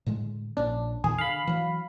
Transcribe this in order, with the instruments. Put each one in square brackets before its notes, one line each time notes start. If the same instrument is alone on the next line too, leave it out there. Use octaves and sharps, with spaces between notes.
[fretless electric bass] A2 D3 G#3
[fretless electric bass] A#1 A#2 C#4 [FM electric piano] D4
[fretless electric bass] E2 A#2 D#3 [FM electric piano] G#4
[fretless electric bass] D3 [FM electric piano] F5 B5
[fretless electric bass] E3 F#3